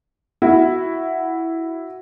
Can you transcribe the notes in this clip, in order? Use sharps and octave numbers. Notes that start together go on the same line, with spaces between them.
E4 F#4